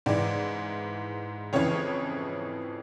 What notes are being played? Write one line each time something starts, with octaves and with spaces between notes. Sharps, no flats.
G#2 E3 D5
F2 C#3 E3 C#5